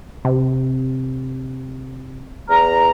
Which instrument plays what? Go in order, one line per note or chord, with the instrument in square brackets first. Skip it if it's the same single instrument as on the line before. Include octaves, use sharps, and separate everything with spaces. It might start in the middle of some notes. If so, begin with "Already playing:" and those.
[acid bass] C3
[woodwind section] E2 A#5